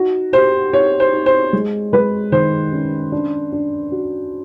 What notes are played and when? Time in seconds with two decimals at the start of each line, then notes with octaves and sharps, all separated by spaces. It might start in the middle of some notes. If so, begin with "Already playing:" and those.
Already playing: D#4 F#4
0.33 G4 C5
0.73 D#4 C#5
1.00 C5
1.12 D#4
1.26 C5
1.53 G#3
1.93 G#3 B4
2.32 D#3 C5
2.73 C#4
3.12 D4
3.52 D4
3.92 F#4